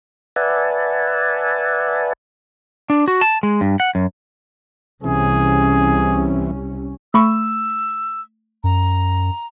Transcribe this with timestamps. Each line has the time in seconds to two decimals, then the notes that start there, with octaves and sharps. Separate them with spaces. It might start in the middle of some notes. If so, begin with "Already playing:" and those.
0.36 B4 D5 E5 F#5 G#5 A5
2.90 D4
3.08 F#4
3.21 A5
3.43 G#3
3.61 G2
3.80 F#5
3.95 F#2
5.04 C2 C3 E3 C#4 G#4
7.14 A3 B5 C#6 E6
8.64 F#2 A#5